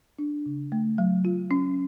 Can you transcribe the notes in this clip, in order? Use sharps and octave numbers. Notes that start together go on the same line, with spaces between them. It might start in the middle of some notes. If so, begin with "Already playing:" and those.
D4
C#3
A3
F#3
F4
C#4